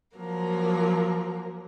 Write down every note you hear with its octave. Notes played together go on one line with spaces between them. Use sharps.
F3 F#3 A#3 A#4